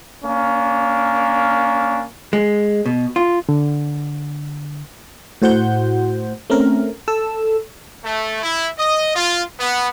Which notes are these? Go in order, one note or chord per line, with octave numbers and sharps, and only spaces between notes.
A#3 C#4 D4
G#3
B2
F4
D3
A2 F#4 C5 F#5 G6
A3 C4 C#4 A#4
A4 E6
A3
E4
D#5
F4
B3